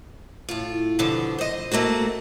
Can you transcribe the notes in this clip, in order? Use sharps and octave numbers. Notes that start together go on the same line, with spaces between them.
A2 F4
G2 B2 D3 F3
C5 D#5
A3 A#3 C4 F#4